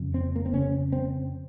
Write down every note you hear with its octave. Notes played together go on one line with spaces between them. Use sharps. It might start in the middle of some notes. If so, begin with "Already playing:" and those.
Already playing: F2 C#3
C4
A#3
C4
F2 C#3 C#4
C4